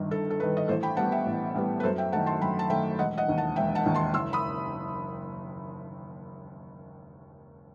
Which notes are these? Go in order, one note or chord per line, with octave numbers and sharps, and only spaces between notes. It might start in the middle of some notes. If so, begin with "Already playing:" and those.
Already playing: G1 G2 D#3
G1 A4
A4
G2 D#3 B4
D#5
A1 A4 C5
G5 B5
A2 G3 B3 F#5 A5
E5 G5
A1
A2 G3 B3
B4
F#2 A4 C5
E5 G5
D#3 A3 F#5 A5
A5 C6
F#2 G5 B5
A5
D#3 A3 E5 G5
E1 D#5 F#5
D#5 F#5
D#2 D#3
F#5 A5
E1 E5 G5
F#5 A5
D#2 D#3
A5 C6
F#1 C6 E6
B5 D#6